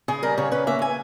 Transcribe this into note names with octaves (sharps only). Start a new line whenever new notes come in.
C#3 G#4
G3 A#4
C#3 C#5
C#4 B4
A#3 E5
G#5